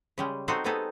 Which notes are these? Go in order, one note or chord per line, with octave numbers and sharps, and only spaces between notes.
C#3 G3 G#3
C4 D#4 F#4 A4 C5
G3 B3 C4 D#4 G#4 A4